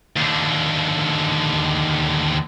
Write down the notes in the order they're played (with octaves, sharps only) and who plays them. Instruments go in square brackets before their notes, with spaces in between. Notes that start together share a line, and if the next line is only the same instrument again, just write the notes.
[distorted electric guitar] D#2 D3